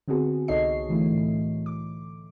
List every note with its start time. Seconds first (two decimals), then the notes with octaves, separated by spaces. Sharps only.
0.08 D3 B3 C4 F#4 G#4
0.48 C2 D#4 A4 C#5 D#5 C7
0.89 D3 E3 A3 E4
1.10 A2
1.66 D6